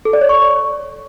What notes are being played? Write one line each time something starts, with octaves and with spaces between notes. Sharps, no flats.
A4
D5
C#5
C#6